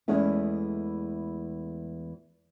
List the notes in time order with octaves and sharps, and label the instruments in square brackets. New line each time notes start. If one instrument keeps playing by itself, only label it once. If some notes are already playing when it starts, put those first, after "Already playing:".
[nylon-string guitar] E2 E3 G#3 A3 C#4 E4